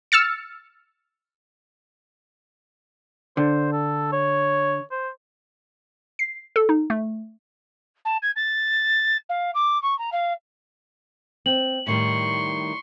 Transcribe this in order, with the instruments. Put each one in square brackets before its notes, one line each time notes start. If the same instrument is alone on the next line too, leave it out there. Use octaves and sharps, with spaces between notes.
[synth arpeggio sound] E6 F6 A6 C#7
[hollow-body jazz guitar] D3 [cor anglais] C5
[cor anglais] A4
C#5
C5
[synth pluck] C7
A4
D#4
A3
[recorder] A5
G#6
A6
F5
D6
C#6
A#5
F5
[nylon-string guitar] C4 [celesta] F#7
[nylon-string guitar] A2 D#3 G3 [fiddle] C6 C#6